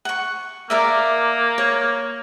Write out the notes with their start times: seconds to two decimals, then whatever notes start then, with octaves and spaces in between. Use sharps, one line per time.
0.05 F#5 C#6
0.70 A#3 A#4 D5 E5
1.58 C#5